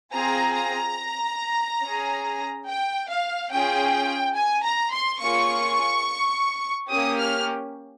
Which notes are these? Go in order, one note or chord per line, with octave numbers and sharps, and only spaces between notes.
C4 F4 G#4 A#5
A#5
C#4 G#4
G5
F5
C#4 F4 G#4 G5
G#5
A#5
C6
A#3 C#4 F4 G#4 C#6
A#3 C#4 G4 D#6
F6